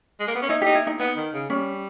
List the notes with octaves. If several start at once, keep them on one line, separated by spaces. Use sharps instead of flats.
G#3
A#3
B3
C#4
D#4 E4
D#4 G4
E4
D#4
B3 D#4
D#3
C#3
G3 C#4